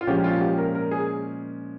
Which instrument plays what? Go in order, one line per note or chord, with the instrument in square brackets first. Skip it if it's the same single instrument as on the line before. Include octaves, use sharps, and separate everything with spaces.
[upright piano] F4
[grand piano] A#2 F3 G#3 C#4 [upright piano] G4
[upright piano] F4
G4
A#4
A#4
G#4